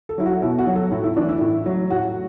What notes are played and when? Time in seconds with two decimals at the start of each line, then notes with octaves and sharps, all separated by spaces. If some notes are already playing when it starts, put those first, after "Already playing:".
0.09 A4
0.18 F#3 E4
0.26 F#4
0.42 B2 E4
0.59 F#4
0.67 F#3
0.75 A4
0.92 A2 E4
1.04 E4
1.16 E3 D4
1.29 E4
1.41 A2
1.66 F#3
1.90 A2 F#4